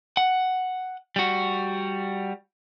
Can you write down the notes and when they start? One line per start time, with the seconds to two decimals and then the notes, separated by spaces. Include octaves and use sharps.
0.17 F#5
1.16 G3 F#4